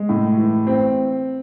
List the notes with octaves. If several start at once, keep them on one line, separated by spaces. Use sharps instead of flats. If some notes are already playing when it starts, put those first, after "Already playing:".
Already playing: G#3
A2
E3
C4